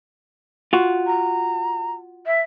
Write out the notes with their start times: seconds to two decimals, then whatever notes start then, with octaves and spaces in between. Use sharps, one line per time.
0.73 F4 F#4
1.07 A#5
2.26 E5